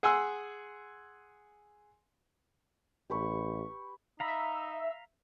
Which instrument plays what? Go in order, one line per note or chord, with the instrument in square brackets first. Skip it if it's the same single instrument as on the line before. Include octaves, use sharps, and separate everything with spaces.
[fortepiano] G#4 F#5 G#5 C6 E6
[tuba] A1 [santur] G4 B4 C#6
[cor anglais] D#4 [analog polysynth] E5 [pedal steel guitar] F5 A#5 B5